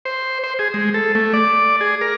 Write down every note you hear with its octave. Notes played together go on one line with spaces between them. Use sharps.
C5
C5
G#4
G#3
A4
A3
D5
G#4
A#4